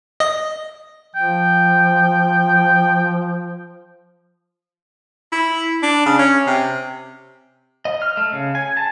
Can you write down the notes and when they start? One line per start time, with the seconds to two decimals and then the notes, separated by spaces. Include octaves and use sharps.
0.20 D#5
1.16 F3 G5
5.32 E4
5.83 D4
6.06 C#3
6.19 C#4
6.47 C3
7.85 D#5
8.02 F6
8.17 A3
8.32 C#3
8.55 G#5
8.77 A5